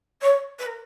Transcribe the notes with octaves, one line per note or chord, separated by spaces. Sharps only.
C#5
B4
A#4